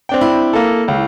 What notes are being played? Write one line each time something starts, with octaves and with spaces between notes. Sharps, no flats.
C4 D4 G5
E4
A#3 A4
C#2